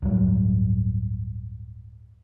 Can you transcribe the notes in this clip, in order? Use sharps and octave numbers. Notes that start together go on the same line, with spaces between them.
D1 G2 F#3 G3